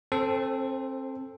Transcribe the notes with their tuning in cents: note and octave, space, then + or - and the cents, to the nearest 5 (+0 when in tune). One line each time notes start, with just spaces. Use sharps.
C4 +30 A4 +0 C5 +0